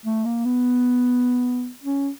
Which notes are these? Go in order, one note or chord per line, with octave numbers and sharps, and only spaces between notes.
A3
A#3
B3
C#4